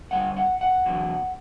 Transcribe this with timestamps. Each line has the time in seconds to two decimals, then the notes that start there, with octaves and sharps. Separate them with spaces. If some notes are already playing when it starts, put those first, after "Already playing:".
0.11 G2 D3 G3 F#5
0.36 F#5
0.61 F#5
0.86 E2 D3 F#3